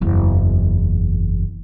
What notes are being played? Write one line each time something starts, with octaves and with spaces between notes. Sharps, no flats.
F#1 E2